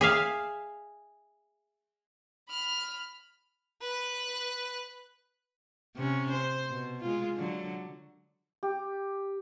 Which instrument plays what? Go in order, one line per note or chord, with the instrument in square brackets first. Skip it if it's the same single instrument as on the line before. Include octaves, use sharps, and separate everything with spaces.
[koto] G#4 E5 F5
[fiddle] B5 F6
B4 F#6
[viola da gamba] C3 C#4
C5
B2
G#3 F4
D3 F#3
[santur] G4